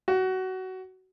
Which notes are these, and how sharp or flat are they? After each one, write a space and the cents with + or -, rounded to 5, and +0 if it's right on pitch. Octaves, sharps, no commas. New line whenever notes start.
F#4 +20